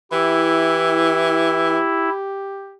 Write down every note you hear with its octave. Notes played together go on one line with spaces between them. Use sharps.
E3 E4 G4